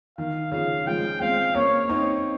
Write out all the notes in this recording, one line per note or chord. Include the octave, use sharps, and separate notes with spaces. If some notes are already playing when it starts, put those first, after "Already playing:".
D#3 F5
C#3 F3 F5
F3 G#3 G5
G#3 C4 F5
A#3 C#4 C#5
C4 D#4